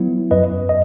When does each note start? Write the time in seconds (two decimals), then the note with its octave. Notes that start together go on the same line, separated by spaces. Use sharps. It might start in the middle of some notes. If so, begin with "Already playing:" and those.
Already playing: F#3 B3 E4
0.31 F#2 B4 D#5
0.69 D#5